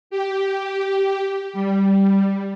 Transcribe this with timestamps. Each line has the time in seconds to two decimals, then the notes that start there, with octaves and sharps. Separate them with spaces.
0.10 G4
1.53 G3